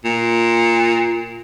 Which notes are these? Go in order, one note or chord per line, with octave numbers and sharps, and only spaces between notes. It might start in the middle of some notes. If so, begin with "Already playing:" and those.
A#2